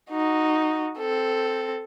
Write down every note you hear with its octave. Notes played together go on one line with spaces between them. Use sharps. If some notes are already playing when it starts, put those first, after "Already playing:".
D#4 F#4
C4 A4